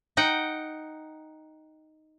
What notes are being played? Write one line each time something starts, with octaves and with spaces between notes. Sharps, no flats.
D#4 F#5 G5